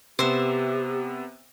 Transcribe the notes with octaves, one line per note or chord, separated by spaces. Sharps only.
C3 B3 G4 C5 E5